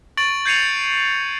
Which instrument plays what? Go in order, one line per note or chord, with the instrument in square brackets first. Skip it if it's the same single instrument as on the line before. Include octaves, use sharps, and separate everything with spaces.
[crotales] C#6 A6 D7 F#7
G6 G#6 C7 C#7 D#7 F7